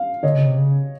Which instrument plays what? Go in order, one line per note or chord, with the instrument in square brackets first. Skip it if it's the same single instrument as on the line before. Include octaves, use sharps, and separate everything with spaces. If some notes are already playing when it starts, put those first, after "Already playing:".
Already playing: [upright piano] F5
[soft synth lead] D3 [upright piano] C#5 D#5
[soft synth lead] C#3
C3
C#3